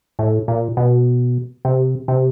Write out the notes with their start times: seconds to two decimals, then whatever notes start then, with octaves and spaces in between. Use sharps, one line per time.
0.19 A2
0.48 A#2
0.77 B2
1.65 C3
2.08 C3